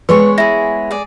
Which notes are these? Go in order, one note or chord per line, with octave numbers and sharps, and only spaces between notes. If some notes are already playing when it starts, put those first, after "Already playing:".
G#3 B3 B4 C#5 C6 C#6
E4 G#4 A#6
G#4 D5